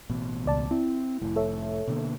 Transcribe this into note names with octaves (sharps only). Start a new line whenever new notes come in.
A1 B2
C#2 D5 A5
C4 E4
F1 A2
A4 C#5 E5
B2 D3 A#3